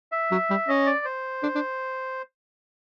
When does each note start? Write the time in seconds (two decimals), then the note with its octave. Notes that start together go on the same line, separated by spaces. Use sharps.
0.12 E5
0.31 F#3
0.50 G3
0.68 C#4 D#5
0.86 D5
1.05 C5
1.43 D4
1.55 D4